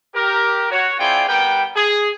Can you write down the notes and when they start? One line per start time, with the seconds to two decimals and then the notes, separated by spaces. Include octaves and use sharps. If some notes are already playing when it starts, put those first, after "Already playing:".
0.15 G4 A#4
0.71 F#4 C#5
0.99 C4 E4 F4 G#4 D5 G5
1.28 G3 B3 A#4 G5
1.76 G#4